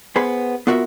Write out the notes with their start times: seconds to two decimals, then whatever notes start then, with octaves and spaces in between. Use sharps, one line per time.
0.16 B3 G#4 C5 B5
0.67 B3 F4 F#4 A#4 E5